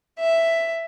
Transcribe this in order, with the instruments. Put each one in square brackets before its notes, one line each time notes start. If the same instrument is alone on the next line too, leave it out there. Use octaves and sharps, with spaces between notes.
[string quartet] E5